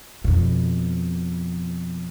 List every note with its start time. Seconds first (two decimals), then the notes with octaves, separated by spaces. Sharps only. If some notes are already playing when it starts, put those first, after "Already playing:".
0.24 F2 B2